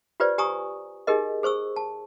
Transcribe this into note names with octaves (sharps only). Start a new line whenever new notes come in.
F4 G4 B4 C5 D5
G4 G#5 A#5 C#6 D#6
D#4 G4 G#4 A#4 D#5
G#4 C5 C#6 E6
A5